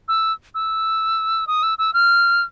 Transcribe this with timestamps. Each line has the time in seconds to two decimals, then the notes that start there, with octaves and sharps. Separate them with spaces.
0.08 E6
0.55 E6
1.47 D#6
1.63 E6
1.78 E6
1.94 F6